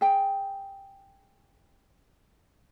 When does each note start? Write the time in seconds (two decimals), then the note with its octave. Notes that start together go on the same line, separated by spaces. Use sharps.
0.01 G#4 G5